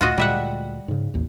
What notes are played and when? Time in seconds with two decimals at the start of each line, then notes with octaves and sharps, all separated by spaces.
0.01 D2 A#2 F4 F#4 D#5
0.18 D2 A#2 G3 G#3 E5 F#5
0.88 G#2 C#3
1.14 A1 D#2